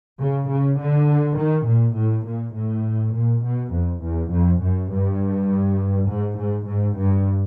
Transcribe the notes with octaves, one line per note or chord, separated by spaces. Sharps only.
C#3
C#3
D3
D#3
A#2
A2
A#2
A2
A#2
B2
F2
E2
F2
F#2
G2
G#2
G#2
G#2
G2